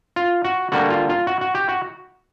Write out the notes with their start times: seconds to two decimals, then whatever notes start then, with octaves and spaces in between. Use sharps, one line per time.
0.16 F4
0.44 F#4
0.72 D3 G3 A#3 F#4
0.90 F4
1.09 F4
1.27 F#4
1.41 F#4
1.55 G4
1.69 F#4